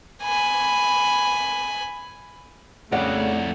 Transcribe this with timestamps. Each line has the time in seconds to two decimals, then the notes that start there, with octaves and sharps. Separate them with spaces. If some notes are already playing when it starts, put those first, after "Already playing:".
0.24 G#5 B5
2.92 F2 C#3 G3 A3 D5 F#5